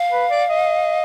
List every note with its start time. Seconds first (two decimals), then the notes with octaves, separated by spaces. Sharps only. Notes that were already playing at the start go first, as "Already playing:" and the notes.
Already playing: F5
0.12 B4
0.30 D5
0.50 D#5